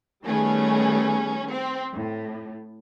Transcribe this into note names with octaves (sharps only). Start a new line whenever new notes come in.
D#3 G3 A3 B3 C#4 G#4
C4
A2